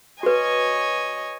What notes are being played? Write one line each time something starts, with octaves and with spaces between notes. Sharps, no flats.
F#4 B4 C#5 D#5 G#5